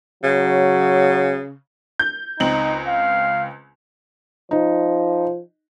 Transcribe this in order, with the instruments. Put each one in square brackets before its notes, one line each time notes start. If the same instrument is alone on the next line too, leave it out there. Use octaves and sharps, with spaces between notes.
[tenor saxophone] C#3 [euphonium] F#3
[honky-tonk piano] G6
[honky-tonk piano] C#2 C4 F#7 [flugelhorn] D#4
[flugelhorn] F5
[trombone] F3 [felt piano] D#4